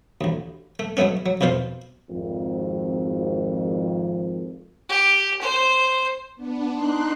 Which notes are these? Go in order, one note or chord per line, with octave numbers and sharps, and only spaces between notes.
A1 D2
A3
F#3 G#3 A3 B3 C#4
F#3
C2 F2 B2 F4 C5
G#1 F2
G4
C5
B3 D4
D4 D#4 C6 F#6